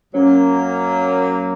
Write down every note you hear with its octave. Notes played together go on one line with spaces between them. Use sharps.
F#2 F#3 A#3 C#4